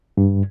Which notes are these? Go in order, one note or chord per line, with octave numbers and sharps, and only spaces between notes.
G2